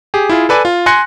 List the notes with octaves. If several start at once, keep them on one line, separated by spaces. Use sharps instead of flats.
G4 G#4
E4 F4 G#4
A4 B4 D5 G#5
F4
G#5 C6 F#6 A#6 C#7